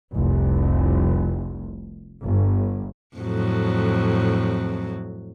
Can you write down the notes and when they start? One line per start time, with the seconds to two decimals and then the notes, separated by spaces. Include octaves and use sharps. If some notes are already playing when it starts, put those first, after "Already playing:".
0.13 F1 C2
2.22 G1
3.17 F2 A2 F#3